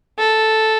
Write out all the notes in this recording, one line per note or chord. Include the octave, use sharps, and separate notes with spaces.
A4